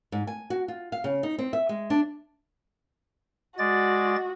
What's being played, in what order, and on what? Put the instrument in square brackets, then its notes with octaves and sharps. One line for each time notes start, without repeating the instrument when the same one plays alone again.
[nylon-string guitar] G#2
G#5
F#4
F4
F5
C#3
D#4
C4
E5
G#3
D4
[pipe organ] G#3 D5 A6 [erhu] F#4